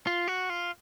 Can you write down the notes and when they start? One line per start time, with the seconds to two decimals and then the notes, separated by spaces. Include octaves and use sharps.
0.07 F4
0.28 F#4
0.50 F4